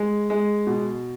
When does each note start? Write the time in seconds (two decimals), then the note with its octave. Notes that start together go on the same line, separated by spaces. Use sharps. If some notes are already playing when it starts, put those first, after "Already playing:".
Already playing: G#3
0.30 G#3
0.67 B2